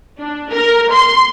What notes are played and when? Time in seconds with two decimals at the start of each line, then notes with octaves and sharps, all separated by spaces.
0.18 D4
0.51 A#4
0.91 C6